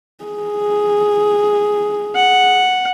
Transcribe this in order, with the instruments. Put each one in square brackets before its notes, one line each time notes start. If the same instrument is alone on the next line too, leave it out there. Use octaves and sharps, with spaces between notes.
[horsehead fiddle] G#4
[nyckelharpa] F#5